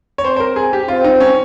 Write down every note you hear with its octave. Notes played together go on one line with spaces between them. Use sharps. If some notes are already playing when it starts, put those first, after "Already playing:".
C#5
C4 C5
C5
A#4
G#4
G4
C4 F4
D#4
C#4